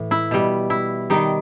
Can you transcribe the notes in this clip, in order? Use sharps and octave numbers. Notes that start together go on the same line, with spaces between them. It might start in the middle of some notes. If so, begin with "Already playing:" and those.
Already playing: A2 E3
E4
B2 G3
E4
D#3 G3 D#4